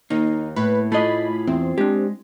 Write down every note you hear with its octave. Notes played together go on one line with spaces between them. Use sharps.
D#2 A#3 D#4
A2 B4
A3 F4 G#4 D#5 B5
E2 C4
G#3 D4 G4